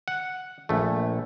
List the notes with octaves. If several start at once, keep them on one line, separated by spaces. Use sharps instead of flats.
F#5
A#1 A3